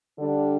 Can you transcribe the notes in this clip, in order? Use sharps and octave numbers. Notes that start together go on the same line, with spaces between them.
D3 G3 D4